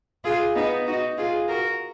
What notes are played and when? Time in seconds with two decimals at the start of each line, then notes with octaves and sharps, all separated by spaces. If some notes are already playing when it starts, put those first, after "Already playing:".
0.24 F4 G#4
0.55 B3 D#4
0.86 D#4 F#4
1.17 F4 G#4
1.48 F#4 A#4